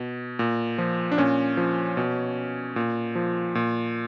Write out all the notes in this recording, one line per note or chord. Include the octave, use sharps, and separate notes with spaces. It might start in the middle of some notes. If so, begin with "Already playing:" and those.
Already playing: B2
A#2
F3
D4
A#2 C#4
F3
B2
A#2
F3
A#2